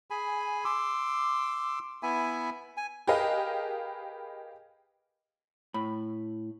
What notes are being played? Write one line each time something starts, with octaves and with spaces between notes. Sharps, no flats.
G#4 G#5 B5
C6 D6 E6
B3 E4 E5 G#5
G#5
G4 G#4 A#4 B4 D#5 F5
A2 B5